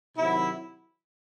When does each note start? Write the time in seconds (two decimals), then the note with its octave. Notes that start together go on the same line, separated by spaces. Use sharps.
0.17 C3 D#3 F#3 E4